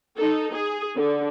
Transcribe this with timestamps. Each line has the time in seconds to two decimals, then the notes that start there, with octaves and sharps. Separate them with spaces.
0.17 D#4 A4
0.54 G#4
0.96 D3